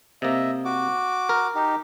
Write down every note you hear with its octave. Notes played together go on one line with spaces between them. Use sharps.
C3 A#3 D#5 E5
F#4 D6
A#4
D#4 G4